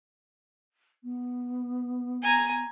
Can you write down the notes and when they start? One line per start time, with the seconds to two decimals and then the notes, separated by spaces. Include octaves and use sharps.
1.03 B3
2.23 G#5 A#5